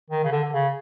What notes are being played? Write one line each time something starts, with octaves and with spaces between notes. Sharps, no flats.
D#3
C#3
D3
D3
C#3